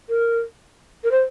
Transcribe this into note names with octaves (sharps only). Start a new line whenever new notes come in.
A#4
A#4
C5